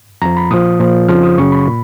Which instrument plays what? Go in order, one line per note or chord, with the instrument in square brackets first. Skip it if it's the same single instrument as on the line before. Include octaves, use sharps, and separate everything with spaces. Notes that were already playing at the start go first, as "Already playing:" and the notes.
[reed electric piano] F2 F3 A#5
B5
A#2 F3 D#6
A#2 F3
F2 C#3 F3 F6
D#6
F#2 C#3 F#3 C#6
B5
A#2